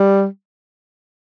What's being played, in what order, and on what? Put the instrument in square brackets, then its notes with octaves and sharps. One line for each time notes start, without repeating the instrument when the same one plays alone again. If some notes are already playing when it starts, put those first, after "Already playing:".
Already playing: [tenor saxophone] G3